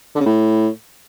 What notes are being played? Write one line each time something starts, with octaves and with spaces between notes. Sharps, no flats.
D3
C#3
A2